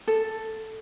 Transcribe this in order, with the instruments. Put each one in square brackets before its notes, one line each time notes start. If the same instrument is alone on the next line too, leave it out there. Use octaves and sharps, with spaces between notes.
[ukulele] A4